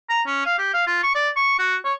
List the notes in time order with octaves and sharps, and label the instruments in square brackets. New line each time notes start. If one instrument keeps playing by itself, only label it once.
[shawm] A#5
C#4
F5
G4
F5
F4
C#6
D5
C#6
F#4
C#5